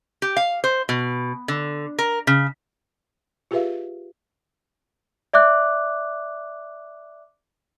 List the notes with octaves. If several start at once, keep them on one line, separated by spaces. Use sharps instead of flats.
G4
F5
C5
B2
D3
A#4
C#3
F4 G4 G#4 B4 E5 F5
D5 E5 D6 F#6